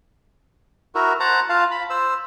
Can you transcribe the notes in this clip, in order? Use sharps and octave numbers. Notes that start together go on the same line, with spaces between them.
E4 F#4 A#4
C5 F#5 A5 A#5
F4 F5 A5
B5
C5 E6